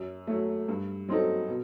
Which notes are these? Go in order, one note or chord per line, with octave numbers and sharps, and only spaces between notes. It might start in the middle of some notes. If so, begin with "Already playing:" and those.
Already playing: F#2
F#3 A3
G2
F#3 C4 D#4 A4
B2